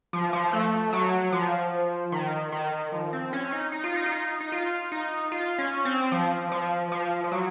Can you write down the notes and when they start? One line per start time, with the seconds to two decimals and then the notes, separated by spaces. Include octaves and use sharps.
0.13 F3
0.33 F3
0.53 A3
0.93 F#3
1.32 F3
2.12 D#3
2.52 D#3
2.92 F3
3.13 C4
3.33 C#4
3.52 D#4
3.72 D#4
3.84 F4
3.94 D#4
4.06 F4
4.12 D#4
4.41 D#4
4.52 F4
4.92 D#4
5.32 F4
5.58 C#4
5.85 C4
6.12 F3
6.52 F3
6.92 F3
7.24 F3
7.32 F#3